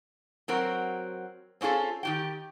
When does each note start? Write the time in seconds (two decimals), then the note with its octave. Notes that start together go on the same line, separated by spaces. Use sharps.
0.48 F#3 C4 F#4 A#4
1.61 C4 C#4 F4 G#4 A4
2.03 D#3 G4 G5